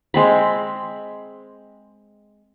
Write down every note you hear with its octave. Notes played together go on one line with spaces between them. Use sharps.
G#3 C4 B5